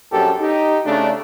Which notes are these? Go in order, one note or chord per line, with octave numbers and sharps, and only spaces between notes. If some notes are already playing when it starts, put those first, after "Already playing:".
A#1 F#2 G4 A4
D#4 G4
C#3 A3 D4